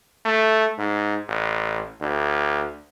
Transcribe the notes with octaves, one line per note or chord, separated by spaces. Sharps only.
A3
G#2
A1
D2